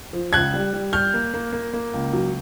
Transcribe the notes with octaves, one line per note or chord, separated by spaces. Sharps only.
F3
C#2 F#6 G#6
G3
G3
G3 F6 G6
A#3
A#3
A#3
A#3
C#2
F#3